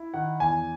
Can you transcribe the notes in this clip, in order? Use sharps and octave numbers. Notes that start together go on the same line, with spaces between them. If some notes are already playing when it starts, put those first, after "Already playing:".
Already playing: E4
D#3 F#5
E2 G#5